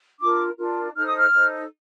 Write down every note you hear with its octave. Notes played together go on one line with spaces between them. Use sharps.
D4 F4 A#4 D6
D4 F4 A#4
D#4 A4 C5 F6
D#6
F6
D#4 A4 C5